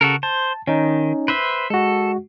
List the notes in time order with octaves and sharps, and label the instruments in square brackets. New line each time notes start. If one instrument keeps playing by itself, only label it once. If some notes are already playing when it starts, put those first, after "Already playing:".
[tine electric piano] C#3 [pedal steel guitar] F#4 A4 A#4
[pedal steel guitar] C5 [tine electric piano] A5
[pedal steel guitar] D#3 [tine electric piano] C#4 D#4
[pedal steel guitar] B4 C5 E5
[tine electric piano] G#3 F#4 [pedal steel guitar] A4